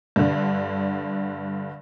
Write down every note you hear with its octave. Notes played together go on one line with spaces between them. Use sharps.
G2 D3